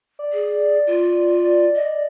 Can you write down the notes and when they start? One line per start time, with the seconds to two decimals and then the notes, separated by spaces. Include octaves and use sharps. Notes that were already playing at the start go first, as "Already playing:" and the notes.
0.19 D5
0.32 G#4
0.86 F4
1.75 D#5